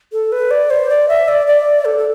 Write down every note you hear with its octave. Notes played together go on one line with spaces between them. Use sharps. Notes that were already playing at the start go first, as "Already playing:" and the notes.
A4
B4
D5
C5
D5
E5
D5
D5
A4
A4